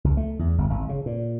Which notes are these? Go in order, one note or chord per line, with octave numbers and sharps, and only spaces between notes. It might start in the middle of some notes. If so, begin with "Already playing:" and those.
C#2
A3
E2
G1
G#1
C#3
A#2